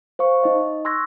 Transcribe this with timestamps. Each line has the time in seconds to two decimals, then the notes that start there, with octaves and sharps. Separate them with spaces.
0.19 C5 F5 C#6
0.43 D#4 D#5
0.85 C6 C#6 E6 F#6 G#6 A#6